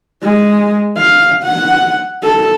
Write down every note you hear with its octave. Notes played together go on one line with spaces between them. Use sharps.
G#3
F5
F#5
A4